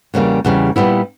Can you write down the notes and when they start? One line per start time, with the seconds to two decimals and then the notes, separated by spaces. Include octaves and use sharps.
0.14 E2 C#3 G3 A#3
0.45 E2 C#3 G3
0.76 A#2 G3 B3 E4